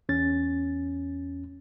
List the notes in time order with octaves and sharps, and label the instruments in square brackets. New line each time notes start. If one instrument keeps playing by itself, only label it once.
[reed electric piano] E2 C#4 A6